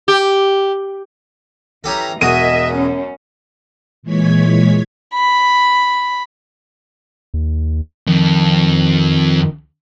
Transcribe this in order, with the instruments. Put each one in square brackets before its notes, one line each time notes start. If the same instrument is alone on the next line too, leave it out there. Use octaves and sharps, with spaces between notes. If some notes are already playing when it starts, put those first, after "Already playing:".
[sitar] G4
[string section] E3 A#5 [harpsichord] C#4 G4 A4
[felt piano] E1 D#7 [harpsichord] F#4 G#4 A#4 [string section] D#5 E5
[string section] F#2 C#4
[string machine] A#2 E3 G#3 C#5 G#6 B6
[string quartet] B5
[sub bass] D#2
[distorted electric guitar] F2 [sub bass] D#3